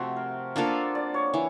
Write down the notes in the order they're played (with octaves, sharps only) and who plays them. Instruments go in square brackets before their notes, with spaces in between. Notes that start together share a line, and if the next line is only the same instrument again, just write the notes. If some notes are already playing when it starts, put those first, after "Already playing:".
Already playing: [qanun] C3 F3 A3 [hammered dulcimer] C4 F#4
[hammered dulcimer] A#4
[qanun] A#3 D4 F4 A4
[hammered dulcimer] D5
C#5
[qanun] E3